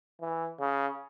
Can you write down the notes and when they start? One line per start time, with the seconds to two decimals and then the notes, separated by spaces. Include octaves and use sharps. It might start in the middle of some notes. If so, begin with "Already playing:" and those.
0.21 E3
0.60 C#3